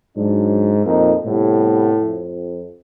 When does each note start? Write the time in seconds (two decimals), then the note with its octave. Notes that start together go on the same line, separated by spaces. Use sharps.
0.17 G#2 F#3 D4
0.85 F2 A#2 A#3 D#4
1.25 A2 C3 G3 B3
2.00 F2